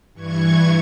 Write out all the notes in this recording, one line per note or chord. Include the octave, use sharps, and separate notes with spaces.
G2 E3 C#6 G#6